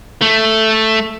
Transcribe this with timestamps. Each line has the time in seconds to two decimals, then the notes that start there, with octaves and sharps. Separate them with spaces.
0.22 A3